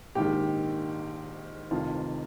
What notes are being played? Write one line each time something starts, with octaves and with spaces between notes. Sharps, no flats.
A#1 G#2 D#3 G4
F1 F2 C3 D#3 F4